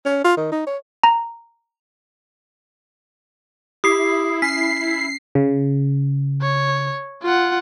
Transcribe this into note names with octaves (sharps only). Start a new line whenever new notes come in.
C#4
F4
D#3
D#4
C#5
A#5
E4 G4 D#6 C7
C#4 B6 C7
C#3
C#5
F4 F#5